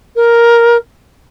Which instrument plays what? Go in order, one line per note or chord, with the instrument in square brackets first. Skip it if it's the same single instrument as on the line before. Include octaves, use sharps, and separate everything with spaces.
[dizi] A#4